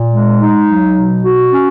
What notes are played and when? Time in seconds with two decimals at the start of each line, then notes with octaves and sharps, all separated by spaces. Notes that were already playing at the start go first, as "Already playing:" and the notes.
Already playing: A#2
0.12 G#3
0.41 D#4
0.69 F#3
0.97 B2
1.23 F#4
1.52 C#4